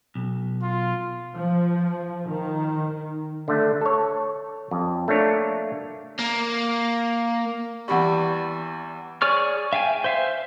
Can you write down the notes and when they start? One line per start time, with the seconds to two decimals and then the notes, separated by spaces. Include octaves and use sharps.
0.15 B1
0.63 F4
1.35 F3
2.27 D#3
3.48 D3 A3
3.81 A4 C#5
4.71 F2
5.08 A3 A#3 D4 C#5
6.19 A#3
7.88 E2 G3 F#5 B5 C#6
9.22 G#4 C#5 D5 C#6 F6
9.73 E5 F5 G5 G#5
10.04 C5 E5 F5